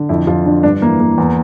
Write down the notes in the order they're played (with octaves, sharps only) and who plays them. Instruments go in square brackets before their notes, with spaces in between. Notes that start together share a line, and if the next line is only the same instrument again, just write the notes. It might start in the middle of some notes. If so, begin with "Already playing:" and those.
Already playing: [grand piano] D3
F2 E4
F2 F4
D3 D4
G2 D4
E3 A#3
E3 A#3
E2